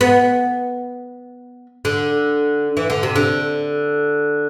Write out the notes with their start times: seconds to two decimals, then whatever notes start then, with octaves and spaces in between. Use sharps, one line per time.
0.01 B3
1.85 D3
2.77 E3
2.90 D3
3.03 C3
3.16 D3